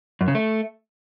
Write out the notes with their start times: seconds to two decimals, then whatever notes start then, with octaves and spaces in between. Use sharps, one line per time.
0.21 F#2
0.28 C#3
0.35 A3